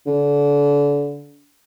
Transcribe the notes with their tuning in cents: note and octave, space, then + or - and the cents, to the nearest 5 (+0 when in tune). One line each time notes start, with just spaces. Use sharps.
D3 -30